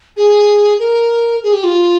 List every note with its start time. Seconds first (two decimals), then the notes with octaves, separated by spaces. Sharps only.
0.17 G#4
0.79 A#4
1.43 G#4
1.53 G4
1.64 F4